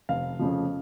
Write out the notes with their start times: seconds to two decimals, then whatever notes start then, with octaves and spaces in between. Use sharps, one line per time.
0.09 F1 F5
0.39 F2 C#3 F3